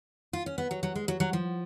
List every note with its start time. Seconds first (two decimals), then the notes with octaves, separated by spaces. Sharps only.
0.33 F4
0.46 C#4
0.58 B3
0.71 F#3
0.83 F#3
0.96 G#3
1.08 F#3
1.20 F#3
1.33 F3